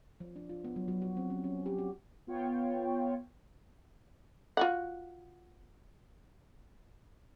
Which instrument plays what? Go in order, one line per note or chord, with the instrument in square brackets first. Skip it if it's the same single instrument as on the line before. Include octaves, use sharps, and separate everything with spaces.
[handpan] F3
D4
F4
B3
F#3
F#3
F#4
C4
C#4
C#4
G4
F#4
[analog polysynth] B3 F4 C#5 G5
[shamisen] F4 F#4 F#5